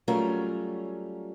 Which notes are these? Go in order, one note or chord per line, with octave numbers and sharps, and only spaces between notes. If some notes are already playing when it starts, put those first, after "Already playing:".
F#3 G3 A3 C#4 F4 A#4